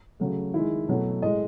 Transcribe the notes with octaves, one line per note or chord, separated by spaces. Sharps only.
C#3 F#3 A3
D#3 G#3 E4
B2 F#3 A3
A2 G#3 D#5